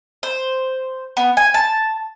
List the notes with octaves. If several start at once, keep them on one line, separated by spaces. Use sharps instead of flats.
C5
B3
G#5
A5